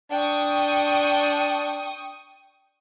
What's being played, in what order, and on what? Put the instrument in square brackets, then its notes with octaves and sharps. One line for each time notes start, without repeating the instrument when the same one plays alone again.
[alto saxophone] D4 [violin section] G5 C#6 D#6